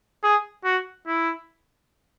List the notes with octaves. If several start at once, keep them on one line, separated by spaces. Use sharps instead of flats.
G#4
F#4
E4